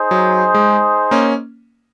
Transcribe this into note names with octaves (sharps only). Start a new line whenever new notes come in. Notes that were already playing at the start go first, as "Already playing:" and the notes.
Already playing: D#4 G#4 C5
F#3
G#3
A#3 C#4